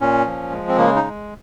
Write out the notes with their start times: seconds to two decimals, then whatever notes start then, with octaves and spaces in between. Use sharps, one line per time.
0.01 A#2 C#4
0.26 F3
0.51 G#3
0.69 C4
0.77 C#3 A#3
0.96 D#4
1.03 G#3